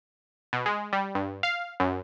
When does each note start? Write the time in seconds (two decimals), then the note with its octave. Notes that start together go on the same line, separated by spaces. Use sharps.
0.53 B2
0.66 G#3
0.93 G3
1.15 G2
1.43 F5
1.80 F#2